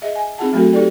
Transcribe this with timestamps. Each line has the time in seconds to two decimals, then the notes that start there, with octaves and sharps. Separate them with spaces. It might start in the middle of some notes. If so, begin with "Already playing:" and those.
0.02 G#4 D#5 E5
0.16 G#5
0.38 C4 D#4 F4 G#4 F#5 A5
0.53 F#3 A3 C4 F#4 A4
0.73 D#4 G4 A4 D5 G5